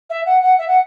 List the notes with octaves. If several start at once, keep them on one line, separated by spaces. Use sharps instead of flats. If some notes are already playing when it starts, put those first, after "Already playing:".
E5
F#5
F#5
E5
F#5